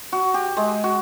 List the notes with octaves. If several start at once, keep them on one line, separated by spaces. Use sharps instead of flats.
F#4
G4
G#3
F#4